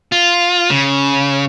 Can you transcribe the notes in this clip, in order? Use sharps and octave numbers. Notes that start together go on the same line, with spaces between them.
F4
C#3